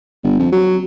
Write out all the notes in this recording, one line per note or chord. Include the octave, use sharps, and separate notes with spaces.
G1
F2
F#3